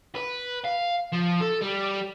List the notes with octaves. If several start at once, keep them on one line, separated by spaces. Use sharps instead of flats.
B4
F5
F3
A4
G3